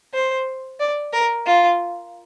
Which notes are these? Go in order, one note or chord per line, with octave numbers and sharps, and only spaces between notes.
C5
D5
A#4
F4